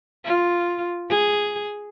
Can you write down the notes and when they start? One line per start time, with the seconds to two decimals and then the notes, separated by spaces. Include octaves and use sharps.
0.25 F4
1.10 G#4